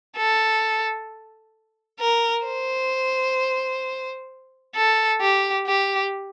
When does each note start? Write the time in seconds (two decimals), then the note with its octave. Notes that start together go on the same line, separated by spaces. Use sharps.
0.18 A4
2.00 A#4
2.46 C5
4.76 A4
5.21 G4
5.67 G4